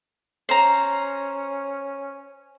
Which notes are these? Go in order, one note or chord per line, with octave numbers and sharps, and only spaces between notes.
C#4 C5 A#5